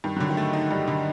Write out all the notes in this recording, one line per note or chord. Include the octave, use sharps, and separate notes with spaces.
G2 D#3
D3 F#3
D#3
A3
D#4
G2 G3
D3